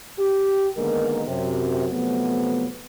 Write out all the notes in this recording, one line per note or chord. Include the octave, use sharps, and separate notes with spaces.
G4
D3 D#3 G#3 A#3 B3 A#4
F#2 C3 F#3
C3 F3 F#3 A3 B3